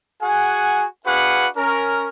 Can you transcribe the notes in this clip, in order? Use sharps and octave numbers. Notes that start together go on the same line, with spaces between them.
F#4 G#4 F#5 G#5
D4 F#4 G#4 B4 F5 F#5
C#4 A#4